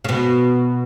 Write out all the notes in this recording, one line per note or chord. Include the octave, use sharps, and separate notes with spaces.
C#3
B2